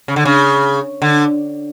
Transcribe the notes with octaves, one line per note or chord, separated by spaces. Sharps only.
C#3
D3
C#3
D3